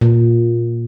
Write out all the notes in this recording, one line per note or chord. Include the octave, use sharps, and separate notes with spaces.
A#2